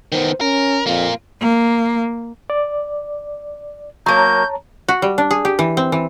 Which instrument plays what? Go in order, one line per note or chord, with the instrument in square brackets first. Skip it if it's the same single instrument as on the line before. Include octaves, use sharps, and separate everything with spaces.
[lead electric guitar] D#3 B3 [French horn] C5
[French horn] C#4 [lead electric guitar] A#4
[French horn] F2 [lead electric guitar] A#3 F4
[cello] A#3
[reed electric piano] D5
[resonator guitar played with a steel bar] F#3 A#3 [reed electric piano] C#5 A5 A#5 [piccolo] G6
[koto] F#4
G3
D4
G#4
G4
E3
C4
E3